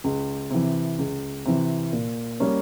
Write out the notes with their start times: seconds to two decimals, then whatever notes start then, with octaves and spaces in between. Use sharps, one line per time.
0.04 C#2
0.50 C3 E3
0.99 C#2
1.45 C3 E3
1.93 A#2
2.40 G3 A#3 C#4